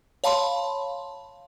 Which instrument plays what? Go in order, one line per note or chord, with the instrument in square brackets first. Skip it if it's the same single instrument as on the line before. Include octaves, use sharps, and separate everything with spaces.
[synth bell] C#5 F5 A5 B5 C6